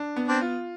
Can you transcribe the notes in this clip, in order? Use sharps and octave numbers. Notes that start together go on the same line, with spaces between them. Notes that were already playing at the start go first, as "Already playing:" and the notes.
Already playing: D4
B3
C4 D4
F4